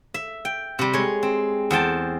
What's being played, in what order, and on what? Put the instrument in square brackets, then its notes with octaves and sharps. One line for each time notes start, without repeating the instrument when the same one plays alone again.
[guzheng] E5
G5
C3 G3
G#3 C#5
C4
E2 C5 G5 A5